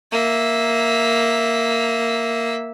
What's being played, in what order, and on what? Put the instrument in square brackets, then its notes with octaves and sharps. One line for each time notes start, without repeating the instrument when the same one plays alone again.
[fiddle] A#3 E5